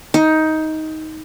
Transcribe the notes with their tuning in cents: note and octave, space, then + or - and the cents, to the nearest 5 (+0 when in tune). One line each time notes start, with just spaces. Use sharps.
D#4 +15